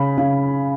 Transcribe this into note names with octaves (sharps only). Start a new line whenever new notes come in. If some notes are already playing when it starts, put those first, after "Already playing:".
Already playing: C#3 B5
C#3